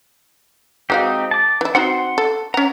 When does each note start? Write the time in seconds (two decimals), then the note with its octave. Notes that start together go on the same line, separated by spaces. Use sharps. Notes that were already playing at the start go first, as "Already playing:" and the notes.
0.90 G#3 C4 D#4 F#4 G4 F5
1.31 A5 D6
1.61 E3 E4
1.75 C4 D#4 F#4 F#5 C6
2.18 A4
2.54 C#4 F#5 A#5